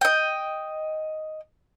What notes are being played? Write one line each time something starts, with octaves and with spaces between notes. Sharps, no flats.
D#5 G5